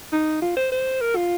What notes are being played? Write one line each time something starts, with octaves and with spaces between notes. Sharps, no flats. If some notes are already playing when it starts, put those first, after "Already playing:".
D#4
F4
C5
C5
A#4
F4